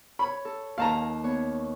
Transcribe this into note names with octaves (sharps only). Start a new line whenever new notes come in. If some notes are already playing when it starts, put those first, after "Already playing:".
C#5 B5
A4
D#2 F5 A5 A#5
B3 C#5